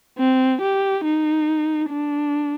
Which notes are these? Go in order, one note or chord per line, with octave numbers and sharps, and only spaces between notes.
C4
G4
D#4
D4